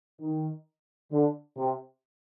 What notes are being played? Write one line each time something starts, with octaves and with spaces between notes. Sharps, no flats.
D#3
D3
C3